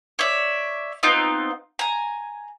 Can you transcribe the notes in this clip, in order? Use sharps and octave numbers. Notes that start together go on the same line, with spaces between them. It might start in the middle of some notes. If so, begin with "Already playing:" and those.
C#5 D5 E5
B3 C4 D#4 F4
G#5 A#5